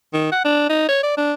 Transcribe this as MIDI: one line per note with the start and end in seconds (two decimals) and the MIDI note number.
0.13 0.29 51
0.32 0.44 78
0.45 0.66 62
0.70 0.87 63
0.89 1.01 73
1.03 1.15 74
1.17 1.33 62